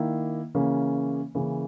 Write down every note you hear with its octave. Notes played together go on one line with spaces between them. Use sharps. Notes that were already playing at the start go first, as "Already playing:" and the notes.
Already playing: D#3 A#3 E4
C#3 E3 A#3 C#4
C#3 E3 A#3 C#4